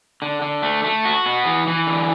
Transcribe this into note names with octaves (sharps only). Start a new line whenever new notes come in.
D3
D3
A3
A3
F#4
B3
E3
E3
D3